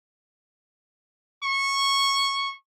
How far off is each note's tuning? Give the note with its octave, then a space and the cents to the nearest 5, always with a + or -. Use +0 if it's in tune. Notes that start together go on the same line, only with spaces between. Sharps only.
C#6 -10